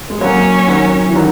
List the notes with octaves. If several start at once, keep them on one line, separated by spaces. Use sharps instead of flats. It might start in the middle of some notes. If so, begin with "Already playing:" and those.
G#3
F#3 A#3 C#4
D#3 F#3
E3
D#3 F#3